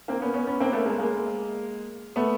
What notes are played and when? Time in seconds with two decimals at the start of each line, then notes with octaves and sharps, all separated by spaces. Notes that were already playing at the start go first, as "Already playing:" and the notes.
0.08 A#3 C4
0.21 B3 C#4
0.34 B3 C#4
0.47 B3 C#4
0.60 A#3 C4
0.73 A3 B3
0.85 G#3 A#3
0.99 G#3 A#3
2.16 A3 B3